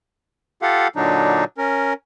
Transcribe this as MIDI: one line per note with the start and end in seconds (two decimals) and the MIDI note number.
0.62 0.88 65
0.62 0.88 67
0.62 0.88 69
0.62 0.88 77
0.62 0.88 78
0.96 1.44 46
0.96 1.44 50
0.96 1.44 54
0.96 1.44 62
0.96 1.44 63
1.58 1.93 61
1.58 1.93 70